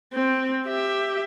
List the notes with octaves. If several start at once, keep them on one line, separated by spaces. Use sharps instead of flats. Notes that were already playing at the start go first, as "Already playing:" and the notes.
C4
G4 E5